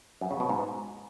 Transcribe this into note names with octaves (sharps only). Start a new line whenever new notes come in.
F#2
C#3
B2
G#2